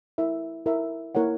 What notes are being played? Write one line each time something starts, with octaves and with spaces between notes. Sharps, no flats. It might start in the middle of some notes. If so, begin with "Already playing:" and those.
E4 A#4 E5
E4 A#4 E5
A#3 E4 A#4 C#5 F#5